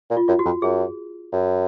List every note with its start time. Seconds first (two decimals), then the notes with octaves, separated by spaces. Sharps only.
0.10 A#2
0.17 F4
0.28 F#2 F4
0.39 F#4
0.45 F2
0.62 F#2 G#4
1.32 F#2